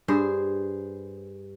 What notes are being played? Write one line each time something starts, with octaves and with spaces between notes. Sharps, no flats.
G2 G#4 C5